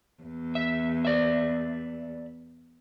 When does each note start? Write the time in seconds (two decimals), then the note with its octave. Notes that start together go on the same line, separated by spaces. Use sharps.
0.23 E2
0.55 E5
1.05 D5 E5